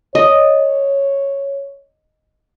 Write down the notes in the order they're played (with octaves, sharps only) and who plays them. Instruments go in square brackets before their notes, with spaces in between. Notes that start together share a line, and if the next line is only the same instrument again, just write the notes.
[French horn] C#5 [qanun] D#5